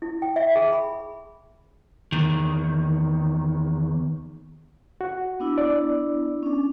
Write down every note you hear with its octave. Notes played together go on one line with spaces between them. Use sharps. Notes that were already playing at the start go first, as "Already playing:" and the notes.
E4
G5
E5
G#4
B5
E2 D#3
F#4
B3 D4 E4
D5
C#4 D4